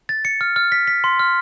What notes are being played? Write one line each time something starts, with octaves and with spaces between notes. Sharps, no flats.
A6
C#7
F6
F6
B6
B6
C6
F6